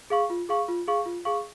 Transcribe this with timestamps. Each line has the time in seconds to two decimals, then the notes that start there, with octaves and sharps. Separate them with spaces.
0.10 G#4 F5 C#6
0.30 F4
0.49 G#4 F5 C#6
0.68 F4
0.87 G#4 F5 C#6
1.06 F4
1.25 G#4 F5 C#6